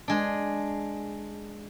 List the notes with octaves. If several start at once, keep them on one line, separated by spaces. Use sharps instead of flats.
G#3 D4